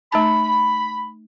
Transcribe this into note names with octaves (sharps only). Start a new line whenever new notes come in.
A3 D#4 A5 B5